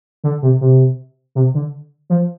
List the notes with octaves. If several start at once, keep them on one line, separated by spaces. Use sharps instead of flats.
D3
C3
C3
C3
D3
F3